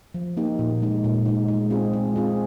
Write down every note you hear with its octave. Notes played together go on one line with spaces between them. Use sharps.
F3
A#3 D#4 G4
A#2
G#3 D#4
A#2
G#3 D#4
G#3
C4 F4 G#4
G#3
C4 F4 G#4